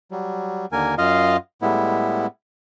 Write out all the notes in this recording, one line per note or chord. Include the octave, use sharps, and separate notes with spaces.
F#3 G3
D#2 D3 A#3 A#4 G#5
F#2 F4 D#5 F5
A2 G3 G#3 B3 E4